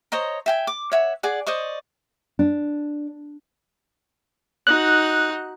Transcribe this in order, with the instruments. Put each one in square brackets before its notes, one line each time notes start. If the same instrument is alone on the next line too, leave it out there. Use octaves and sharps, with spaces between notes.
[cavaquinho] C5 C#5 D#5 A#5
E5 G5 G#5
D6
C#5 E5 F#5
G#4 D5 F#5
C5 D5 D#5 C#6
[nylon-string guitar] D4
[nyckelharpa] D#4 F#4 [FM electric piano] F#6